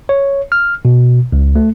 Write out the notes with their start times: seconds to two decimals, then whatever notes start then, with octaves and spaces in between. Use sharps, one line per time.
0.09 C#5
0.52 F6
0.85 B2
1.32 C#2
1.56 A3